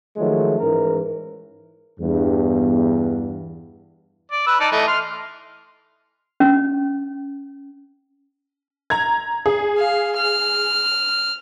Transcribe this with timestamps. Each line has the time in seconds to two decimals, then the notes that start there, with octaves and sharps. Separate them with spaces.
0.17 D#3 F3 F#3 G#3 A3
0.59 G#2 E3 C#4 A#4
2.00 E2 G2
4.31 D5
4.47 B4 E6
4.60 D#4 D5 A5
4.72 E3 A3 D#5
4.87 C6 F6
6.40 C#4
8.90 A#5 G#6
9.46 G#4
9.77 F5
10.17 F6